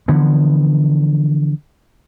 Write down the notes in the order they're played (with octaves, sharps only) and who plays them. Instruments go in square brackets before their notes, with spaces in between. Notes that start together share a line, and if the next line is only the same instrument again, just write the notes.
[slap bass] D3 E3 F3 B3